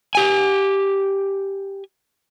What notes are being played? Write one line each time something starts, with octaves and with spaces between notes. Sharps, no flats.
G4 G#5